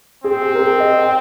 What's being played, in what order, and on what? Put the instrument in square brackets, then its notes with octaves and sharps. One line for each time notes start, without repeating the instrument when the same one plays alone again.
[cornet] C4 [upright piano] G#4
[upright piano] G4
A#4
G#4
D#5
G5